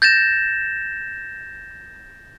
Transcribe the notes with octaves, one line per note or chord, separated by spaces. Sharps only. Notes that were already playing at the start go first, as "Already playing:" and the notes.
G6 A6 A#6 E7